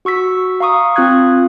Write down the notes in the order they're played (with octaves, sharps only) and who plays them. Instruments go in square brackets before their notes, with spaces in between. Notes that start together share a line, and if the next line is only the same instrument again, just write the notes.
[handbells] F#4 C#6 E6 B6
F5 A#5 C#6 D#6
C4 F4 F5 D#6 F#6 G#6